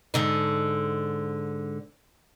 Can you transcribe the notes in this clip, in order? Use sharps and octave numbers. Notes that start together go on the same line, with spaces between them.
G#2 D3 D#4